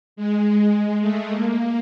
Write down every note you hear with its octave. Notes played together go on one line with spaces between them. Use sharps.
G#3
G#3
A3
A#3